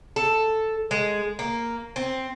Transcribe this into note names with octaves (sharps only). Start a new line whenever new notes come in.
A4
G#3
A#3
C4